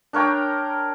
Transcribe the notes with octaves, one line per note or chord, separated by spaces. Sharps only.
D4 A#4 C#5 G5